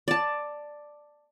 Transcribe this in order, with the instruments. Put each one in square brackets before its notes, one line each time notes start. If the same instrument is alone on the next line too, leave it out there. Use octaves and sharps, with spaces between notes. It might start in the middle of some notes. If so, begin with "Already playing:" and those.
[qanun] D5 A5